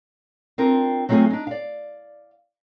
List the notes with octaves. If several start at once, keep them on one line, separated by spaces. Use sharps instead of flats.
C4 D4 F4 A#4
F#3 A3 C4 F4 G#4
D4 D#4
D5 F5